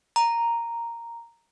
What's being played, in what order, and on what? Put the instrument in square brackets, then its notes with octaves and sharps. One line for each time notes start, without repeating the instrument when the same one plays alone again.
[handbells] A#5